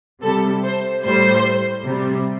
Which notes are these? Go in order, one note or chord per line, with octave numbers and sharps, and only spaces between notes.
C3 G3 A4
C5
A2 G3 C5
C3 G3